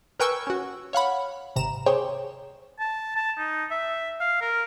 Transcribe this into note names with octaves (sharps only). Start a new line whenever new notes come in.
A#4 B4 G5 G#5 C#6 E6
C#4 F#4
C#5 F5 F#5 B5
G#1 C3 A#5 E7
C4 G4 G#4 C5 C#5 G5
A5
A5
D#4
E5
F5
A#4